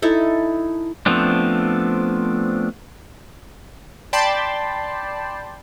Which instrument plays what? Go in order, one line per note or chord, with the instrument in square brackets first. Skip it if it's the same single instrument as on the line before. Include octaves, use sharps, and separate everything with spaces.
[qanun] D#4 E4 A4
[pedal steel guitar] F3 A3 B3 C4 D4
[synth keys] D5 G5 A5 B5 C6